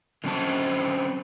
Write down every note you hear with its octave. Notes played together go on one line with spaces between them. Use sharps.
D3 F#3 C4 C#4 C5 A5